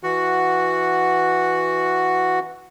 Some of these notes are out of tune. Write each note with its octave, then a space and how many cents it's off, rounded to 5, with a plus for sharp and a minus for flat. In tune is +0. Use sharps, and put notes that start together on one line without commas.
E3 +0 F#4 +0 F#5 -5